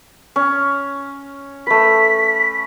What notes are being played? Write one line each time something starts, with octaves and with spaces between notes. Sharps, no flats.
C#4
A3 B4 B6